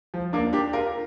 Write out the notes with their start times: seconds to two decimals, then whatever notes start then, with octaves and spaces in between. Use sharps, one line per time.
0.14 F3
0.33 A#3 D4
0.53 D4 G4
0.73 F4 A#4